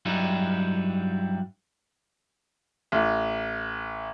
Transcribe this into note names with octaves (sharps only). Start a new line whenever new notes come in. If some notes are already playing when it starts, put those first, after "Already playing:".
G2 F#3 G3 D#4 E4
A1